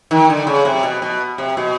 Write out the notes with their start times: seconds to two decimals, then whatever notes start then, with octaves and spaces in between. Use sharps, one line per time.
0.11 D#3
0.30 D3
0.47 C#3
0.65 C3
0.83 B2
1.02 B2
1.38 C3
1.57 B2